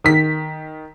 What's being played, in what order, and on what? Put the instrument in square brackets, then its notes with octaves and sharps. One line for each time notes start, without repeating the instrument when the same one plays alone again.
[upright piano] D#3 B6